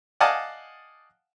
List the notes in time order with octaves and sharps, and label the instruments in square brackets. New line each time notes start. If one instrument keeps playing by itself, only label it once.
[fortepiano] D5 D#5 F5 F#5 G#5 A5